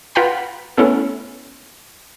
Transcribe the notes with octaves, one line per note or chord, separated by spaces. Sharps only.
F4 B4 F#5 G5 A#5 B5
A3 B3 C#4 E4 A4